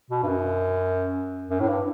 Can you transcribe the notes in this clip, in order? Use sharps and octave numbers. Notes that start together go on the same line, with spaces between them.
B2
G2
F#2
F#2
A2
G2